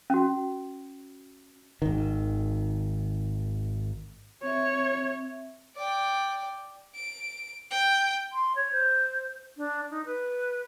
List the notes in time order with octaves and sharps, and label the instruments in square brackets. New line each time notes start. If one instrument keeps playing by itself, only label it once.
[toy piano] C#4 F#4
[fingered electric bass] G#1 D#3
[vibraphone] C4 E5 [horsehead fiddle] C#5
[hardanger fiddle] D5 G5
[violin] D7
G5
[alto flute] C6
C#5
C5
D4
D#4
B4